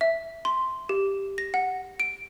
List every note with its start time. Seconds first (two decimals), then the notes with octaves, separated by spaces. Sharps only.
0.01 E5
0.45 C6
0.89 G4
1.38 A#6
1.54 F#5
2.00 D7